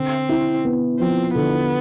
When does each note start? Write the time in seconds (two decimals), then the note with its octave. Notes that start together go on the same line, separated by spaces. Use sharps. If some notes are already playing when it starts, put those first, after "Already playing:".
Already playing: D3 C4
0.29 E4
0.65 B3
1.00 F3 C4
1.35 D3 B3